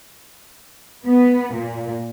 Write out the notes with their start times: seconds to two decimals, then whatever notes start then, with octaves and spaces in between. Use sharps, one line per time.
1.06 B3
1.53 A#2